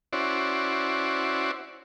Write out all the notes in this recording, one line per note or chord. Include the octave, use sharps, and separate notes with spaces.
C#4 E4 F#4 C5 D5